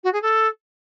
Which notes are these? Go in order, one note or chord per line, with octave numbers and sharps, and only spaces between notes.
F#4
G#4
A4